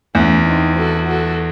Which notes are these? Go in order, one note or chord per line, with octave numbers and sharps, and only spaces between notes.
E2 A3 C#4
C4 D#4
F#4 A4
F#4 A4